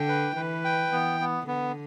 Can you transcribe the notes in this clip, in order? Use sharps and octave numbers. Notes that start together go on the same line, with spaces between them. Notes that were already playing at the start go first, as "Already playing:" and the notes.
Already playing: D3 G5
B4
E3 B4
G5
E3 B3
B3
D3 B3